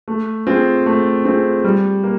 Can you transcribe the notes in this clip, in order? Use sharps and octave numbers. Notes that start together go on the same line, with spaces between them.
A3
C4 F4 G#4
A3
C4 F4 G#4
G3
A#3